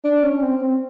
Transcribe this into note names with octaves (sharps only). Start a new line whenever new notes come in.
D4
C#4
C4
C4